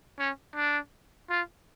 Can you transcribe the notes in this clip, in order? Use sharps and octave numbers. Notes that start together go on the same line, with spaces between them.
C#4
D4
F4